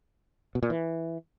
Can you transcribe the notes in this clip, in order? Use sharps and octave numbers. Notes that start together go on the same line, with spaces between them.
B2
A#2
E3